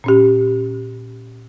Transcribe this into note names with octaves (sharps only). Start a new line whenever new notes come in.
A#2 C#4 G4